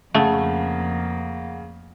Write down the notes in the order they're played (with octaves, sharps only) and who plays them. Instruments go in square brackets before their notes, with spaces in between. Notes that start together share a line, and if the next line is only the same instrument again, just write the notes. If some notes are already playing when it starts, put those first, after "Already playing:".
[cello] F2 A#3 [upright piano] C#3 [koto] A3 [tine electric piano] F5 F#5